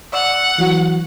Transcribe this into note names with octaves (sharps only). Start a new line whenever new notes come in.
D5 F#5 E6 C#7
E3 F#3 F#4